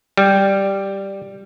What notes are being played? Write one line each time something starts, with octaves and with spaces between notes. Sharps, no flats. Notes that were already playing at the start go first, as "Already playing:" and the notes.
G3